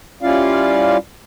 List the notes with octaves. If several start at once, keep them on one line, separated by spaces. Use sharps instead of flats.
G3 C#4 E4 F4 D5 F5